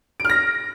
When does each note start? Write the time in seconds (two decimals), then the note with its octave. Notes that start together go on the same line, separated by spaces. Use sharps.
0.20 D7
0.25 F6
0.30 A#6